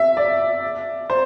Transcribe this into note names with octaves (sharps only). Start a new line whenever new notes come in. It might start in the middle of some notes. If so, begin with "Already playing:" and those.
Already playing: E5
D5
C5